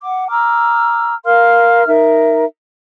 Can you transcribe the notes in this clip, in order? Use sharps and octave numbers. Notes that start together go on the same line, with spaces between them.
F#5 D6
A#5 D6 E6 F6
A#4 F5 C6 F6
D#4 A#4 E5